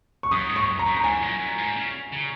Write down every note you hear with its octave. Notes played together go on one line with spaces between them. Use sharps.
C#6
F#2 D#6
G#2
C#6
F#2
A#5
F#2
A#5
G#2 G#5
F2
F#2
F#2
G#2
C#3
C#3